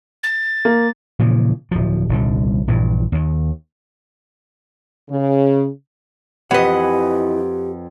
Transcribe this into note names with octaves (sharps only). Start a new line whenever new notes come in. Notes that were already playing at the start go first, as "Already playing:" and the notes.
A6
A#3
A#2 C#3 E3 F3
D1 F3
D#1 C2 D3
A#1 G2 E3
D#2 D#3
C#3
F2 E3 G4 B4 D#5 F#5